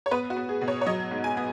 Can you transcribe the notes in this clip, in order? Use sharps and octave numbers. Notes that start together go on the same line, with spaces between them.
C#5
B3 B4
F#4
B3
G#4
B2
C#5
C#5
F#3 D#5
G#2
G#5
B3